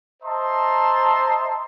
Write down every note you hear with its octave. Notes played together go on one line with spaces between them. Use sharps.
C5 D#5 E5 A5 A#5 C6